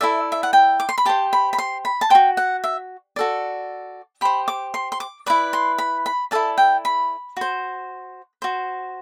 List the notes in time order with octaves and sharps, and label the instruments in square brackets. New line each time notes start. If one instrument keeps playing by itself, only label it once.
[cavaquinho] E4 A4 D5 E5
E5
F#5
G5
D6
C6
B5
G4 C5 A5
B5
B5
C6
B5
A5
C5 G5
F#4
F#5
E5
F#4 A4 D5
G4 C5 B5
D6
C6
C6
D6
E4 B4 D5 D6
C6
B5
B5
E4 A4 D5 A5
G5
B5
F#4 C5
F#4 C5